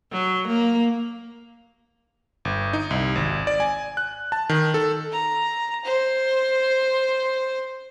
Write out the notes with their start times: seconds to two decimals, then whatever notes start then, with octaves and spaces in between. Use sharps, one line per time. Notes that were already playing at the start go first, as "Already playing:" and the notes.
0.12 F#3
0.48 A#3
2.45 G1
2.73 D#4
2.91 C2
3.15 G#1
3.47 D5
3.60 G#5
3.97 F#6
4.32 A5
4.49 D#3
4.74 A4
5.12 A#5
5.84 C5